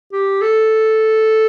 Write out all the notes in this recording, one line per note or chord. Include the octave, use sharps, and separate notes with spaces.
G4
A4